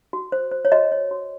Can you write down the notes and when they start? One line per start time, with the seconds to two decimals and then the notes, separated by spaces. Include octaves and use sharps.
0.13 F#4
0.32 C5
0.51 C5
0.65 C#5
0.72 F#4 D#5
0.92 C#5
1.11 F#4